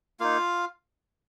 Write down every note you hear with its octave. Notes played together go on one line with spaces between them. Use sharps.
A#3 D#4 F4 F5